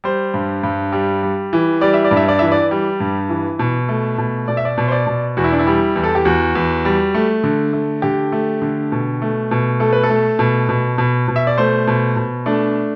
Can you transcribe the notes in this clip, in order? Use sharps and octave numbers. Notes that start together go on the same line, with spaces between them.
G3 C5
G2
G2
G3
G3
E3
G3 D5
E5
D5
G2
E5
D5
E3 E5
D5
G3
G2
E3
B2
A3
B2
B2 D5
E5
D5
B2
C5
D5
B2
E2 F#4
E4
D4
E4
G3
E2
A4
G4
E2 F#4
E2
G3
A3
D3
A3
D3 G4
A3
D3
B2
A3
B2
A3 A4
B4
A4
A3
B2
B2
B2
B2
E5
D5
A3 C5
B2
B2
A3 D4